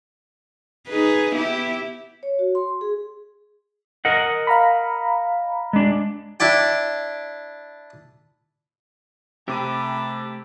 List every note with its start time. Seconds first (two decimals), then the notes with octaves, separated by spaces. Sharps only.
0.88 D#4 G#4 B4
1.35 B3 E4 G4
2.23 C#5
2.39 F#4
2.55 C6
2.81 G#4
4.05 A#4 D#5 F#5
4.47 F5 A#5 B5
5.73 G#3 D4
6.40 D4 E4 D5 G5
9.48 C3 A3 G4 A5 B5 D6 D#7